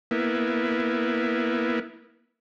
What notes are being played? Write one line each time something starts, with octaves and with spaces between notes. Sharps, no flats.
A#3 B3 E4